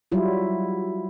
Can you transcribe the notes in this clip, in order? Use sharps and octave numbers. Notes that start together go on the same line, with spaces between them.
F#3 G3 E4 F4